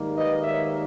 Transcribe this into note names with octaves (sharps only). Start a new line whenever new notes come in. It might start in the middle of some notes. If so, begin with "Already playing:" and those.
Already playing: G#2 D#3 G3 A#3 D#4
B4 D#5
C#5 E5